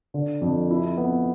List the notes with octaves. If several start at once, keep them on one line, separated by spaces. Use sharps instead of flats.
D3
F2
E4
B3